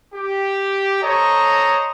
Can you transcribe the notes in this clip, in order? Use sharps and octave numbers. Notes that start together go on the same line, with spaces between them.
G4
A4 C5 C#5 D#5 A#5